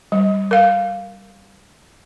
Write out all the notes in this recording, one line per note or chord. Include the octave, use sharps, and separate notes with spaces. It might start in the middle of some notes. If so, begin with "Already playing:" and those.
G3
A#4 F5